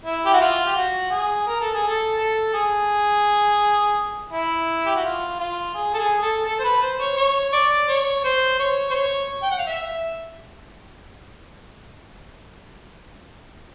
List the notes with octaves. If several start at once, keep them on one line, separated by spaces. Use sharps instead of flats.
E4
G4
F#4
F4
G4
F#4
G#4
A#4
A4
G#4
A4
A4
G#4
E4
G4
F#4
F4
F4
G#4
A4
G#4
A4
A4
C5
B4
C5
C#5
C#5
D5
C#5
C5
C#5
C5
C#5
G5
F#5
F5
E5